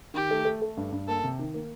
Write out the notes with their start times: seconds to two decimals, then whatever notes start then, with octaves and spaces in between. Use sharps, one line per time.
0.14 D#3 G4
0.31 A3
0.45 A3
0.62 A3
0.77 G2
0.92 G2
1.08 A#3 A4
1.24 C3
1.39 D#3
1.54 A#3